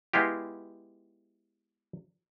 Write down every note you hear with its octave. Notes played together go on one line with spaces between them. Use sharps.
G#3 B3 E4 F4 G4